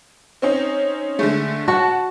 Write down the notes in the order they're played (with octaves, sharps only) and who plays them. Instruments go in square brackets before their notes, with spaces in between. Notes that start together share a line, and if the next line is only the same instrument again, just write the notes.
[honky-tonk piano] C4 C#4 D#4
D3 G#3 A3
[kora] F#4 [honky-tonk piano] F#5 A5